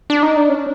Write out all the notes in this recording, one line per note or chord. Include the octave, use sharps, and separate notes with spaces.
D4
D#4
D4
C#4